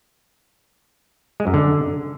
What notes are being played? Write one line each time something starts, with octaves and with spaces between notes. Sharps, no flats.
G#3
F#2
D3